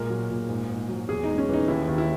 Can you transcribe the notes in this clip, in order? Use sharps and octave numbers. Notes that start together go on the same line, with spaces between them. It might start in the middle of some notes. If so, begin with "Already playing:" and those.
Already playing: A#2 G#3 A#4
F#3
A#2
G#2
G#2
F#3
E2 G#4
G#3 D#4
C#4
E3 D#4
D#2 E4
D#2
E4